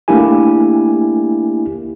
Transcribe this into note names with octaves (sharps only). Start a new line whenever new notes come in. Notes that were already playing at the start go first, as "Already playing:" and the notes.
A3 A#3 D4 E4 G4 G#5